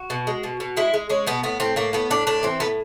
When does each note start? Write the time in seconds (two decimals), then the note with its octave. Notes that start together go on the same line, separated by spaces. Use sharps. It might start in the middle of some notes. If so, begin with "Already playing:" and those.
Already playing: F#4
0.10 B2
0.27 G#3
0.43 B2
0.60 B2
0.77 G#3 E4
0.94 G#3
1.09 G#3 C#4
1.27 B2 B3
1.43 A2 B3
1.60 A2 C4
1.76 A2 A#3
1.93 A2 B3
2.11 A2 D4
2.27 A2 D4
2.43 E3 C4
2.60 A2 B3